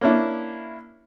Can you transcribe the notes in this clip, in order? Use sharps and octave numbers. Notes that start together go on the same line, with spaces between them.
A#3 C#4 D4 E4